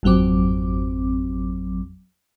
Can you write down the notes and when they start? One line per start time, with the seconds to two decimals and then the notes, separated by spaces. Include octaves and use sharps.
0.03 G#1 F2 F#3 C4 D6